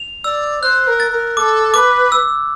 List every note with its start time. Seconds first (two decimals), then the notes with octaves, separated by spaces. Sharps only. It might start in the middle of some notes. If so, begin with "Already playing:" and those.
Already playing: F7
0.24 D5 E6
0.62 C5 F#6
0.87 A#4
1.00 A6
1.12 A#4
1.37 A4 D6
1.74 B4 D6
2.12 E6